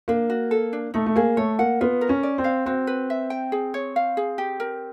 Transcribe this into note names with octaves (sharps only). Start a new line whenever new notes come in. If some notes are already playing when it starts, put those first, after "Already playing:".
A#3 D4
F#4
A4
D4
A3 D#4
A3
A#3 G#4
A3 C#5
A#3 F#5
B3 F4
A#4
C#4
D5
C4
F5
C4 F#4
B4
E5
G5
G#4
C#5
F5
G#4
G4
A#4